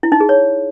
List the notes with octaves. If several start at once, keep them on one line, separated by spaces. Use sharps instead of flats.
E4
D#4
G#4
C#5